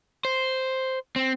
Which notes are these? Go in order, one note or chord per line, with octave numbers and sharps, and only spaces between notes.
C5
C4